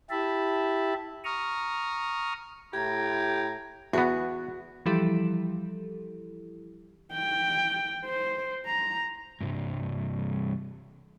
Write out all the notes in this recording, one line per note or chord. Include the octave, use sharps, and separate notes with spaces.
E4 G4 E5 A5 B5
A#5 C#6 D#6 F6
A2 E4 G4 A#5 G#6
E2 B3 F#4
E3 F3 G3 E4 G4 A4
G5
C5
A#5
C2 G2